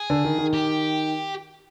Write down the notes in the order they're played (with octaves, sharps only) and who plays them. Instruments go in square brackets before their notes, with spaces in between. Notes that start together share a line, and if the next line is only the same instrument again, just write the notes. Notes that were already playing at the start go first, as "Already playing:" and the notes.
Already playing: [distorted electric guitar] G#4
[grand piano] D3
D#3
D#3
[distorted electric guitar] G4